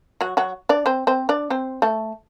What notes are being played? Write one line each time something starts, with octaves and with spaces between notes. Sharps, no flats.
F#3 F#4
F#3 F#4
D4 D5
C4 C5
C4 C5
D4 D5
C4 C5
A3 A4